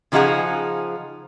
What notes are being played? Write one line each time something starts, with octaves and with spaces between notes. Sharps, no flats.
C#3 F3 D#4 F4 G#4 F#5